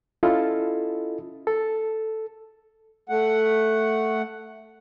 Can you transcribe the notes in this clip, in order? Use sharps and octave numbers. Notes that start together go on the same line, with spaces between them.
C#4 E4 F4 A4 D#5
A4
A3 F#5